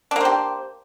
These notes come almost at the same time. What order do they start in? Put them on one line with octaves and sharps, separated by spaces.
D4 A#3 C5 G4